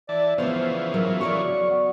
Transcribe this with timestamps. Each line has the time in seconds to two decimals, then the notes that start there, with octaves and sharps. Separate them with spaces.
0.09 E3 D5 A5
0.38 C#3 E3 F3 B3 C5 F5
0.94 F#3 A#4
1.21 F#4 A#4 D5 C#6
1.70 B3